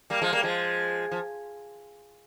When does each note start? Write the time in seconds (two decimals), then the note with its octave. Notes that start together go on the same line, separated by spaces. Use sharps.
0.10 G3 A#3
0.22 F3 G#3
0.33 G3 A#3
0.43 F3 G#3
1.11 F3